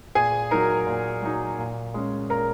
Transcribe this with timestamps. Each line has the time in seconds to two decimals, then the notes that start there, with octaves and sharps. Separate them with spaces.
0.15 A#2 G#4 G#5
0.51 F#3 D#4 A#4 A#5
0.86 A#2
1.22 F#3 D#4
1.58 A#2
1.94 G#3 C#4
2.30 A#2 A#4 A#5